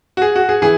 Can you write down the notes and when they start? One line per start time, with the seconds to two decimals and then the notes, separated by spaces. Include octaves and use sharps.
0.17 F#4
0.22 G#4
0.36 F#4
0.49 G#4
0.62 E3 G#4